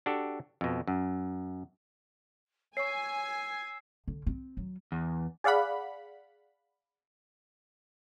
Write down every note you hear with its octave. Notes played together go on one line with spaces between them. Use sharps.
D4 F#4 G4 A4
F2 B2
F#2
C#5 G#5 C#6 E6 C7
D3
C4
F#3
E2
G#4 D5 F5 F#5 B5